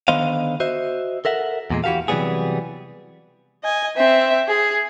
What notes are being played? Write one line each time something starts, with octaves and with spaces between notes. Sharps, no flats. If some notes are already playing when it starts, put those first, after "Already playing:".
D3 D#3 B3 C5 D#5 F5
F#4 C5 D#5 E5
A4 A#4 E5 F#5
E2 A#2 G#3
E3 F#4 G4 A4 F5
C3 E3 F#3 G3 B3 G#4
D#5 G#5
C4 E5
G#4